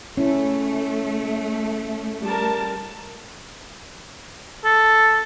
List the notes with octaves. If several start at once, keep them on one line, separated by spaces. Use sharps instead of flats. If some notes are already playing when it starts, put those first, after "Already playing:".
A3 C#4 E4
G3 A#4 A5
A4